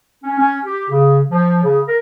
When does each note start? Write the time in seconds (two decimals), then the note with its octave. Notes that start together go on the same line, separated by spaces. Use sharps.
0.24 C#4
0.38 C#4
0.65 G4
0.89 C#3
1.30 F3
1.62 C#3
1.86 A#4